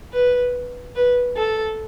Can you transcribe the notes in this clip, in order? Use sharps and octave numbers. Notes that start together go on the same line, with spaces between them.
B4
B4
A4